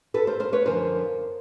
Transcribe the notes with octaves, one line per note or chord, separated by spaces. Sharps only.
A4 B4
A#4 C5
A#4 C5
B4 C#5
F#2 D3 F3 A#4 C5